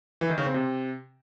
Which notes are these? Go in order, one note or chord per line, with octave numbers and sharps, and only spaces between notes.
E3
D#3
C#3
C4
C3